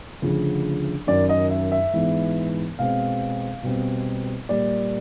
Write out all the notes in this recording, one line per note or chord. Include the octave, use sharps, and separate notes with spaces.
D2 C#3 F3
F#2 D#3 F#3 D5
D#5
E5
E5
G#2 E3 G#3 B3
B2 G#3 C4 F5
B2 G3 C4
A#2 G3 A#3 D5